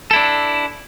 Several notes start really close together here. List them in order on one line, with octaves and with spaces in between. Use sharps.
A4 E4 D4